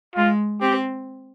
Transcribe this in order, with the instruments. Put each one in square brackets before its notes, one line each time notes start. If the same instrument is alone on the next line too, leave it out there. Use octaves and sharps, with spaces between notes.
[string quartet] G#3 [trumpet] F4
[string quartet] C4 [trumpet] G4